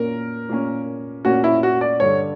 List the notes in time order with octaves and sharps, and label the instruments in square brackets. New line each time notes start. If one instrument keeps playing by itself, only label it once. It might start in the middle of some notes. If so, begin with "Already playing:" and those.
Already playing: [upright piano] A#2 A#3 C#4 [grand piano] A#4
[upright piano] A#2 A#3 C#4
[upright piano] A#2 A#3 C#4 [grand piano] F#4
[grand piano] E4
F#4
D5
[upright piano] G2 D3 G3 [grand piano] C#5